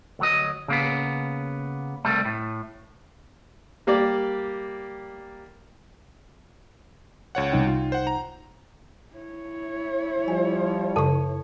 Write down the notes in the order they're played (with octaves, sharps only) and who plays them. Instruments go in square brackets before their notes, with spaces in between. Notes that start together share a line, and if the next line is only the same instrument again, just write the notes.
[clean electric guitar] D2 F#3 D#5
C#3 A#3 B3
C2 G3 A3
A2
[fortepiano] G3 A#3 G4 D5
[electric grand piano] C#2 C#5 F#5
[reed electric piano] C2 D#4 G5
[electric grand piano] F4
C5 F#5
A#5
[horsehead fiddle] E4 C#5
[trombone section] F3 G3 [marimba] G#5
[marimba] F#2 C#3 C#6 [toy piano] A4 A5